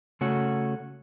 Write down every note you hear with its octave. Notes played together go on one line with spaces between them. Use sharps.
C#3 A3 C#4 F#4